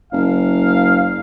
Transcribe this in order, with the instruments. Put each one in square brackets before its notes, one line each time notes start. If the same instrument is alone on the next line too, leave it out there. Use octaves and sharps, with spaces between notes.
[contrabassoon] F#1 [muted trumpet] F5